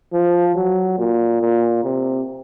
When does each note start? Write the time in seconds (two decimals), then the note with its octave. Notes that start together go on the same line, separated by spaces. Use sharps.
0.13 F3
0.55 F#3
0.98 A#2
1.41 A#2
1.84 C3